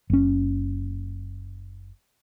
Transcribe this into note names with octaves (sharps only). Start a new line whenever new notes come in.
F#1 C#4